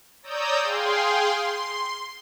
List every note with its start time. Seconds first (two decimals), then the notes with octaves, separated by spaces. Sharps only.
0.23 C#5 D5 A#5 D#6 E6 G6
0.62 G#4 F5 G5 C6
1.40 C6